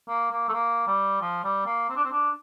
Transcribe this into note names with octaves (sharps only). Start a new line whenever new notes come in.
A#3
A#3
A3
A#3
G3
F3
G3
A#3
C4
D4
C4
D4